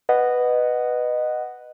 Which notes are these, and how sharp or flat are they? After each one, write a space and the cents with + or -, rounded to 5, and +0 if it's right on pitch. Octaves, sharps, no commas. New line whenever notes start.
B4 +0 D#5 -15 F#5 +5